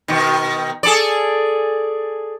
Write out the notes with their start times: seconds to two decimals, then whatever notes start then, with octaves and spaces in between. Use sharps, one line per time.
0.08 B2 D#3
0.83 G#4 A4 D5